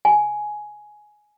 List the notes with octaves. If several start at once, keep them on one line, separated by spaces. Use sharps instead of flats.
G#5